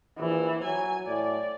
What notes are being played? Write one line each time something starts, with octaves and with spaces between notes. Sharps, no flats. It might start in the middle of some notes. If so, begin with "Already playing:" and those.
A#1 E3
F#3 G#5
A2 D5